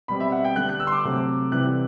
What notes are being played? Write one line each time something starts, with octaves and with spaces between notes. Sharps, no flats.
B2 G3 C4 B5
E5
F#5
G5
D3 G3 B3 F#6
F#6
E6
C6
D6
C3 F#3 A3 C4
C3 E3 G3 F#6